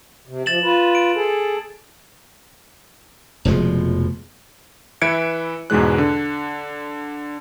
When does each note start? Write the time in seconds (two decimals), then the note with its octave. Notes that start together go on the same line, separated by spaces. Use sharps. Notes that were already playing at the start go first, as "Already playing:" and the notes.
0.28 C3
0.46 F3 A6 E7 F#7
0.62 F4 B4
0.95 D7
1.15 G#4 A4
3.45 F1 B2 F3 G#3
5.02 E3 B4 E5 G#6 C#7 D7
5.70 E2 G#2 B2 E3 G#3 F#6
5.98 D3